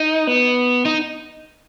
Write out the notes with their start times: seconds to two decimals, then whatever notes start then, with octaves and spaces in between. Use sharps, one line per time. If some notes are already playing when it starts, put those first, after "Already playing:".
Already playing: D#4
0.27 B3
0.85 D#4